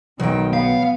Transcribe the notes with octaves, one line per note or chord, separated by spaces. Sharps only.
B1 D#3 F#3 G5
B3 F5